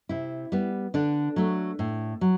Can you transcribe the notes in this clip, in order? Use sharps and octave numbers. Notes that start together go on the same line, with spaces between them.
C3 E4
G3 B3
D3 D4
F#3 A3
A2
F#3